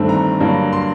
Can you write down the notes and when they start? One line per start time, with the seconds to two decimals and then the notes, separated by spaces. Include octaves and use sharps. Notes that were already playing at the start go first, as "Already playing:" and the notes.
Already playing: G1 G2 D#3 A3 C4
0.09 A#5
0.40 G2 D3 F#3 A#3
0.73 C6